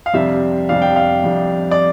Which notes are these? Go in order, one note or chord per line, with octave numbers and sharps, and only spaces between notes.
F5
F2 C3 G3 D4 E5
F2 C3 G3 D4 F5
G5
F5
F2 C3 G3 D4
D5